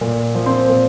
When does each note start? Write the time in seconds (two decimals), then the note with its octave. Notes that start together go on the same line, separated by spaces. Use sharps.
0.01 A#2
0.35 F3
0.46 C4 C5
0.69 A#2